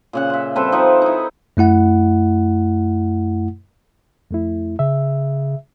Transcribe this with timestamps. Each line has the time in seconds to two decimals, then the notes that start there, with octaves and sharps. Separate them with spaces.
0.13 A#2 C#3 F#5
0.30 F4 E5
0.56 G3 C4 A4 B4
0.72 F3 D#4 E5 F#5
1.02 D#4 E4
1.57 F#2 A3 E4 F#5
4.31 F2 A3 E4
4.79 C#3 E5